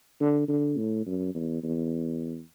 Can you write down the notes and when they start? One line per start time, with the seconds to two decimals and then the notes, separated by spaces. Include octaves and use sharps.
0.20 D3
0.48 D3
0.77 A2
1.06 F#2
1.34 E2
1.63 E2